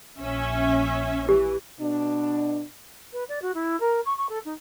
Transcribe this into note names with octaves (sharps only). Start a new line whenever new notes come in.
A#1 C#4 E5
E3 G4
B2 D4
B4
D5
F#4
E4
A#4
C#6
C#6
A4
D#4